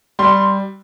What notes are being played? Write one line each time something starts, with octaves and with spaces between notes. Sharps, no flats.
G3 C6